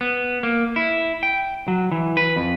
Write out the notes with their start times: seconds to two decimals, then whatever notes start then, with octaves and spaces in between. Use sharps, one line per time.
0.01 B3
0.43 A#3
0.76 E4
1.23 G5
1.68 F#3
1.92 E3
2.17 B4
2.36 F2